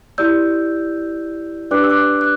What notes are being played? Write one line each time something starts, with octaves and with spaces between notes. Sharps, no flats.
E4 G4 D5 E6 G6
D4 G4 B4 D5 D6 F#6
E6
D6 F#6
F#6